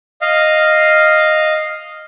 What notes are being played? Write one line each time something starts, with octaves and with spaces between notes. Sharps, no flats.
D#5 F5